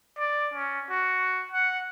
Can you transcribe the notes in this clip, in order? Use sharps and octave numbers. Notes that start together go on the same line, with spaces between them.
D5
C#4
F#4
F#5